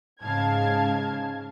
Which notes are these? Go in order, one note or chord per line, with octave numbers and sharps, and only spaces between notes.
G#2 C#3 F5 A5 G#6